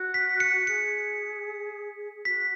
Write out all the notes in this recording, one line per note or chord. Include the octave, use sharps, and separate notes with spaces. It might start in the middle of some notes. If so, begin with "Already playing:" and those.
Already playing: F#4
B6
C#7
G#4 C#7
F#4 B6